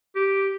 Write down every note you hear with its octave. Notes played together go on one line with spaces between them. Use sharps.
G4